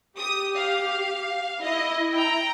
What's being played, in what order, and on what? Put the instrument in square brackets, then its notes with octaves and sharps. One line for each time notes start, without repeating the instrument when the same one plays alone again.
[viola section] G4 [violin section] D#6
[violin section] F5
[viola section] E4 [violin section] D#5
[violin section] G5 A#5